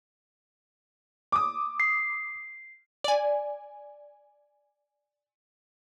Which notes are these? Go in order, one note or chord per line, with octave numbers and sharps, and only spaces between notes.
D6 D#6
C7
D5 G#5